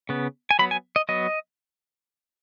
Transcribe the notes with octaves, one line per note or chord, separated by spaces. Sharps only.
C#3 B3
G#5
F#3 B3 B5
G#5
D#5
F#3 B3 D#5